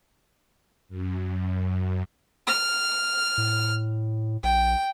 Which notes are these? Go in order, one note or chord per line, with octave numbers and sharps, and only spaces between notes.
F#2
F6
A2
A#1 G5